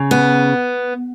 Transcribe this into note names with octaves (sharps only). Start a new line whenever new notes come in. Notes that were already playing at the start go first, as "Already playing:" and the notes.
Already playing: C#3
B3